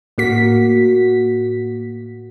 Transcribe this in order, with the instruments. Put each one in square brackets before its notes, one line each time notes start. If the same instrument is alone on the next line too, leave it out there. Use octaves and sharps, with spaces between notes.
[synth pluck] A2 A#3 F#4 B6